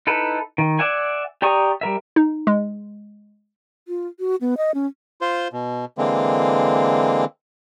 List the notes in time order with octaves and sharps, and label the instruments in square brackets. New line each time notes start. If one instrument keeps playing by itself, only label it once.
[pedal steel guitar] D#4 E4 A4 B4
D#3
D5 E5 F#5 G#5
G4 D5 A#5 C#6 D#6
G3 A#4 E5
[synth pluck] D#4
G#3
[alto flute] F4
F#4
B3
D#5
C#4
[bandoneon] F4 C5
B2
D3 E3 G#3 A#3 C4